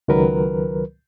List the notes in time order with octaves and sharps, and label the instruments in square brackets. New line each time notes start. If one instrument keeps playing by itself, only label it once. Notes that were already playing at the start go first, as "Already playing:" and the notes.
[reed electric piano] C#2 D#3 F#3 A#4 B4